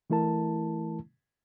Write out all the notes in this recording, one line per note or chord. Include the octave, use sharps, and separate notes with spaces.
E3 A3 E4 A#4 A5